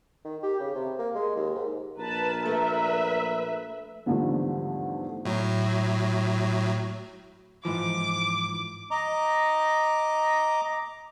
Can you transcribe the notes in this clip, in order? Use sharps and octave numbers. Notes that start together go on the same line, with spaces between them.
D#3
G4
C#3
C3
A#3
G#3
D#2
G#2
A#1 A#4 B4 A5
A3 B4 E5
E2 G#2 D3 F3 G3 A3
A2 F#3
G#2 E3 F3 D6
D#5 A#5 D6